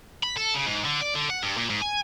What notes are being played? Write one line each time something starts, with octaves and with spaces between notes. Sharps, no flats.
B5
A4
C#3
G#2
D3
D5
D3
F#5
G2
A#2
G#2
G#5